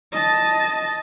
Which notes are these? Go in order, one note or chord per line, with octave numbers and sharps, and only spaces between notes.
D#5 A5